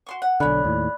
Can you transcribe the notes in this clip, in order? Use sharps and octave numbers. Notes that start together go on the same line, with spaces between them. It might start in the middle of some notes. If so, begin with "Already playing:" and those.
F#4 C6 C#6
F#5
B1 D3 C#4 C#5 D5 B5 F#6
D#2 A2